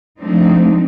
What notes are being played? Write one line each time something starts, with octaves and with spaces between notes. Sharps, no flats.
F3 G#3 A3 C4 D4 D#4